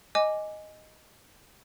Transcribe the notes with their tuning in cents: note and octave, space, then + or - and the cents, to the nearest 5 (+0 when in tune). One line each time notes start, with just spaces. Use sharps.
D#5 +0 G#5 +0 D6 +0